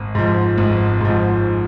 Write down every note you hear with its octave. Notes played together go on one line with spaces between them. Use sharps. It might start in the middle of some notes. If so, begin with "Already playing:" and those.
Already playing: G#1
G#2 F3
G#1
G#2 F3